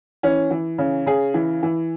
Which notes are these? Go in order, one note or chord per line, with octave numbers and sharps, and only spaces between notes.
E3 C#4
E3
C#3
C#3 G#4
E3
E3